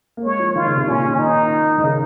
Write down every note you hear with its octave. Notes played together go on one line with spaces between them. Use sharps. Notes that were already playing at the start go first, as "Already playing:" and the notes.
A#3
G#3 C#5
F3
D#3 F4
C#3
C3
A#2 C#4
D#3
D#4
D#3
C#3